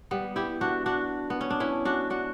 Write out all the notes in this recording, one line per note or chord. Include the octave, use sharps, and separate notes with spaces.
G3 B3
E4 G4
D4 F#4
D4 F#4
B3
C#4
D4
C#4 E4
D4 F#4
D4 F#4